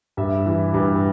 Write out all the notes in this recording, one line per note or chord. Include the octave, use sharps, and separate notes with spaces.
G2 E5
E3
G2